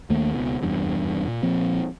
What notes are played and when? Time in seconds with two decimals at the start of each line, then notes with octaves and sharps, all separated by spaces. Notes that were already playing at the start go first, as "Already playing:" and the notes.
0.10 D#2 D#3 A3 A#3
0.34 C#2 B2
0.62 F1 E2 G2
1.27 A#2
1.43 A#2 F3 C4